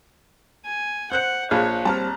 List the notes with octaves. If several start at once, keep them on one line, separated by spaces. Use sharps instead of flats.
G#5
C5 F#5 F#6 G6 C#7
A#1 F4 G#4 C#5
G3 C4 A5 A#5 F6